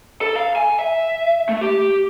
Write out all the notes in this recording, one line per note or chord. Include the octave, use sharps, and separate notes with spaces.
A4
F5
G#5
E5
A3
G4